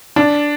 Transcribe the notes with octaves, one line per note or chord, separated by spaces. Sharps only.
D4